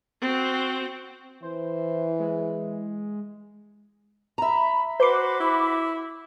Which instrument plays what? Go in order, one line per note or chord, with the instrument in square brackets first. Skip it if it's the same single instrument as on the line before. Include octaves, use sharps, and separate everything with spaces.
[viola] C4 F#4
[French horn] E3 [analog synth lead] C5
[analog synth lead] G#3
[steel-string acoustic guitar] E5 A#5 [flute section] B5
[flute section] F#4 B5 D6 [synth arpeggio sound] B4 C7 [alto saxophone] C5
[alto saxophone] E4